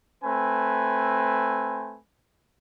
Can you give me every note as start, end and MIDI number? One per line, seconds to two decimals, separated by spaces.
0.23 1.98 57
0.23 1.98 60
0.23 1.98 71
0.23 1.98 80